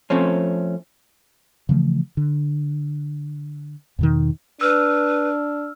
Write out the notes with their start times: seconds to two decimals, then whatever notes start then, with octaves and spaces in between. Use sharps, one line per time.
0.10 F3 A3 C4 C#4
1.69 C#3 E3 F3 A3
2.17 D3
3.99 E2 B2 D#3
4.61 D4 B4 E6 F6